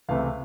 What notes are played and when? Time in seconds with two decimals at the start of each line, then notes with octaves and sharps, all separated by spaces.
0.09 C#2 C3 E3 A3 F5